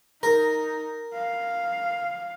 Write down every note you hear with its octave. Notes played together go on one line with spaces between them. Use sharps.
D#4 A#4
F5